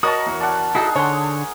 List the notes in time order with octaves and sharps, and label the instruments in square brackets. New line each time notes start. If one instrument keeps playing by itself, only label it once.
[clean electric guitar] F#4 [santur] A#4 C#5 [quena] D#5 [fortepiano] A5 D#6
[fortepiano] E2
[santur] D5 F#5 [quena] A5
[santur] D#4 G#4 [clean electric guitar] E4 F#4 A4
[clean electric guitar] D3 [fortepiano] C#5 F#5 C6